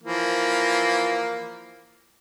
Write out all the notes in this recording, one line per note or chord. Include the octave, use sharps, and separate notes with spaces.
E3 F3 A#3